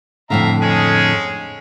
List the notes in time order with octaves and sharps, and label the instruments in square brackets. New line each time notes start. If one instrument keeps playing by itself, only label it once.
[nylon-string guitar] F2 A2 D3 [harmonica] E5 F5 A#5
[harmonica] G#3 C#4 G#4